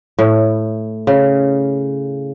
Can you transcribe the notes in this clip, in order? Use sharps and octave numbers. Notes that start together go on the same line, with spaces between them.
A2
C#3